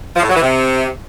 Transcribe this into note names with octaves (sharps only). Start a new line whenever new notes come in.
F3
A2
F#3
E3
C3